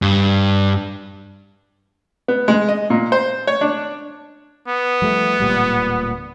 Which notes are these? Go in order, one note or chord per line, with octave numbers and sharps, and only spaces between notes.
G2
B3
G#3
D#5
A#2
C5
C#5
D4
B3
F3 G3 A3
D1 A#2 G3